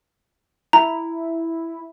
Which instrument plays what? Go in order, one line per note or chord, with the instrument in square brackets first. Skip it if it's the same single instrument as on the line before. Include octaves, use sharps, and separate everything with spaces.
[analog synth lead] E4 [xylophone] A#5